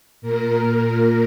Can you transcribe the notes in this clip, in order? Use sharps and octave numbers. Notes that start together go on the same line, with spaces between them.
A#2 A#4